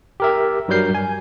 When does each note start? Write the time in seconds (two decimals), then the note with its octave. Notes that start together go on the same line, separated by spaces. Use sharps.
0.20 G4 A#4 E5
0.68 G2 F#3 G3 A#4 G6 C7
0.95 G#5